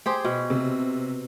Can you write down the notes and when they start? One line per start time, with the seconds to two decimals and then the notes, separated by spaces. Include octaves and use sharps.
0.06 G4 G#4 C5
0.25 B2
0.50 C3